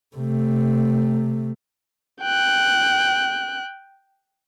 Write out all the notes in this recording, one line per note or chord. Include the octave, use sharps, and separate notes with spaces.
C3 A3
G5 F#6